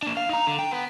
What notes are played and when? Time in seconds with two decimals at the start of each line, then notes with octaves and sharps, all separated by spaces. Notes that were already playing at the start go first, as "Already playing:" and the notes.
0.03 A#3 D4
0.17 F5
0.29 D#4 A#5
0.47 D3
0.59 G5
0.71 B3